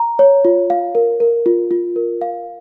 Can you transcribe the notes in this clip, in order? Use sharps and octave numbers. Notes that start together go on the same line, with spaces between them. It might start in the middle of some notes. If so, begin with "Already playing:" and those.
Already playing: A#5
C#5
F4
F5
A#4
A#4
F4
F4
A#4
F5